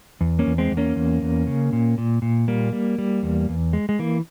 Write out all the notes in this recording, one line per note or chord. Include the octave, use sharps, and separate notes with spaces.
E2
A#3 C#4
E2
G#3 C4
E2
A#3 C#4
E2
E2
C#3
A#2
A#2
A#2
G3 A#3
G3
G3
E2
E2
G#3
G#3
E3 A#3